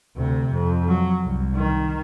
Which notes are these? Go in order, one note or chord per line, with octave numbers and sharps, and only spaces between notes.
D2 C3
F2
F#3
C2
D#3